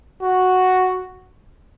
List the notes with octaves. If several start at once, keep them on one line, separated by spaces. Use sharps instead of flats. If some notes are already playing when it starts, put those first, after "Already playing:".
F#4